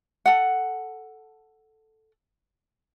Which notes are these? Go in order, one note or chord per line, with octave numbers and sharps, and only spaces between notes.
A4 F#5